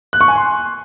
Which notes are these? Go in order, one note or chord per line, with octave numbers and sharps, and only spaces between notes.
F#6
C#6
G#5
C6